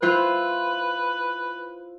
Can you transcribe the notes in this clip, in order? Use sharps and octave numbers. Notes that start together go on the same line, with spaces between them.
E4 F4 B4 C5